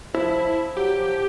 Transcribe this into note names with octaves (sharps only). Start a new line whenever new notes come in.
F3 E4
F#3 G4
F3